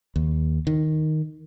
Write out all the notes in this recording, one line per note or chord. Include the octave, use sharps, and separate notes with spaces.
D#2
D#3